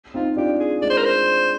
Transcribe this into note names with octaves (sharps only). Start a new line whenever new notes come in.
C4 D#4 F4
D4 F4 G4
G#4
G#3 D5
C5
A#4
C5